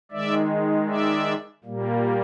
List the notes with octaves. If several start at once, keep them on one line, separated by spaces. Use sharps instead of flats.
D#3 G#3 D5 E5
D5 E5
A#2 G3 A#3